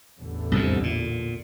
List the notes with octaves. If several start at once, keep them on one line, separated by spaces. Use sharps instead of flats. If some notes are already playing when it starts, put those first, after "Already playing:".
A1 E2 D3
C2 F2 G#2
A#2